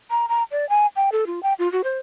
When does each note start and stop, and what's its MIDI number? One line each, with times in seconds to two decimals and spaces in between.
0.11 0.26 82
0.29 0.43 82
0.51 0.68 74
0.69 0.86 80
0.96 1.10 79
1.12 1.25 69
1.27 1.42 65
1.43 1.53 79
1.59 1.70 65
1.72 1.82 66
1.84 1.98 72